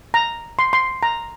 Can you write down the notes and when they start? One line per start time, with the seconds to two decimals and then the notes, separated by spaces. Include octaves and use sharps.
0.14 A#5
0.59 C6
0.73 C6
1.03 A#5